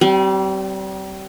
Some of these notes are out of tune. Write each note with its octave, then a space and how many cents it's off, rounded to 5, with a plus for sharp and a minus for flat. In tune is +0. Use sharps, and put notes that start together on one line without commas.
G3 -35 C4 +0